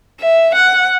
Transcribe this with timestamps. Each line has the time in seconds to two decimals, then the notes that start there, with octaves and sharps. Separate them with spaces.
0.21 E5
0.55 F#5